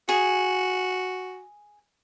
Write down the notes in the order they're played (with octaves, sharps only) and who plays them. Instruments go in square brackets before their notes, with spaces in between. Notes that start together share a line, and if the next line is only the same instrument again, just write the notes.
[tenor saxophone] F#4 [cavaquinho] G#4